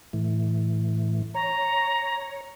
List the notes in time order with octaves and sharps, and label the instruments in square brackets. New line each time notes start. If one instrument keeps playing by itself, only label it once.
[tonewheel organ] A2 E3
[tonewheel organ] C#5 [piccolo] A#5